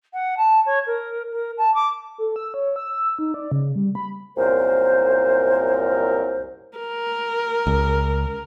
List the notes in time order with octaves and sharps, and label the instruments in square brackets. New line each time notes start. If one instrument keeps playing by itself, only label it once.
[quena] F#5
A5
C#5
A#4
A#4
A5
D6
[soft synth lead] A4
E6
C#5
E6
D#4
D5
C#3
G3
B5
[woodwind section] C2 F#2 A#2 A#4 C5
[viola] A#4
[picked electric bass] C#2